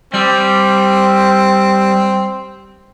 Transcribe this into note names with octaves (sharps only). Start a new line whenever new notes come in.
G3 C4